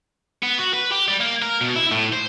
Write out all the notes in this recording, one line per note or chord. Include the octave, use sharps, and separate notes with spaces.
B3
F#4
B4
G4
G3
A#3
A#4
B2
E4
A2
C5